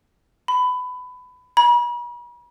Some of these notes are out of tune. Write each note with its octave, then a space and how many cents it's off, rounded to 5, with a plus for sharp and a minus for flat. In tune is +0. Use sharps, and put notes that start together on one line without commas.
B5 +20
B5 -45